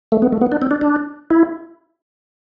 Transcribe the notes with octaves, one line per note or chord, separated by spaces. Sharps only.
A3
B3
A3
B3
D4
C4
D4
D4
E4